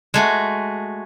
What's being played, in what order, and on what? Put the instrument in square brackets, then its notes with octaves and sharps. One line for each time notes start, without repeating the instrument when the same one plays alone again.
[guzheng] G#3 A3 F#4